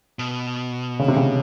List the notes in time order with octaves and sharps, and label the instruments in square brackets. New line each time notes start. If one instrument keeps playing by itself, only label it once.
[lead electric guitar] B2
[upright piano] C#3
C3
C#3